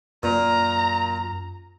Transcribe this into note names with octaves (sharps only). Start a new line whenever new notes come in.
F#2 A#2 A#5